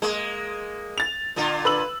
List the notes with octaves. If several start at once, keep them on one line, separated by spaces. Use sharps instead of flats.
G#3 A#3
A6 F7
A#2 D3 F4
B4 E6 F#7